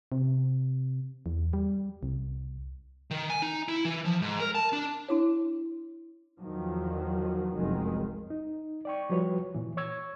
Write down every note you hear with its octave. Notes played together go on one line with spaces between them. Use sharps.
C3
E2
G3
C2
D#3
G#5
D#4
E4
E3
F3
G#2
A#4
A5
D4
D4 E4 C#5
E2 D#3 F3 F#3
F1 C2 F#2 D#3 F#3 G#3
D#4
D5 G5 C#6
F3 G3 F#4 B4 C#5
A#2 E3
C#5 C#6 E6 G#6